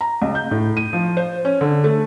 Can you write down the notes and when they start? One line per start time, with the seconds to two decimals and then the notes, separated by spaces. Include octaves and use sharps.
0.01 A#5
0.22 C#2
0.35 G6
0.51 A2
0.77 D#7
0.93 F3
1.17 C5
1.45 C#4
1.61 D3
1.84 A3